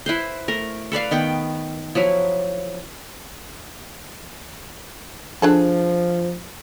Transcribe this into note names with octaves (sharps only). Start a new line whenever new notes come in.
E4 B4 C5
A3 A#4
A4 B4 D5 F5
D#3 B3 G5 B5
F3 F#3 E4
F3 D4 G#4 A4